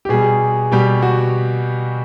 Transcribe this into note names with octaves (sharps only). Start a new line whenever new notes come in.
G4
B2 G3 G#4
B2 G3 G4
F#4